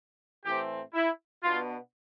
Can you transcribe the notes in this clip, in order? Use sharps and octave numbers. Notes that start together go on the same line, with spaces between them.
A2 E3 A3 C4 G4
E4
B2 B3 D4 F4